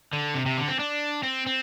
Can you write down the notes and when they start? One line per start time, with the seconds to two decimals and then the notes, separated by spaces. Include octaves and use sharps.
0.13 D3
0.34 C3
0.46 C3
0.57 D3
0.68 C4
0.79 D4
1.23 C4
1.46 C4